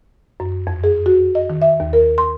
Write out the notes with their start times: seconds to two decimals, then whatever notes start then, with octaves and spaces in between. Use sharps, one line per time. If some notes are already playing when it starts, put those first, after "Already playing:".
0.40 F#2
0.67 F2
0.84 G#4
1.06 F#4
1.35 D#5
1.50 D#3
1.62 E5
1.80 D#2
1.93 A#4
2.18 C6